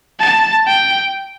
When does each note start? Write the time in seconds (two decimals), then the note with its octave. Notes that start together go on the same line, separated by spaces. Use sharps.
0.20 A5
0.67 G5